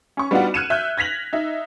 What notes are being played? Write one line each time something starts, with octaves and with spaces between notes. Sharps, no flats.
C#4 C#6
G3 B3 D4 D#4 F4 F#4
F6 F#6 G#6 C#7 D#7 E7
E5 F#6 G6
G#6 A#6 B6 F7 F#7
D#4 E5